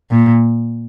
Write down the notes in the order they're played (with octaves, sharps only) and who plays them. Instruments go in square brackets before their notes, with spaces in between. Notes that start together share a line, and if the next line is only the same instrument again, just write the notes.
[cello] A#2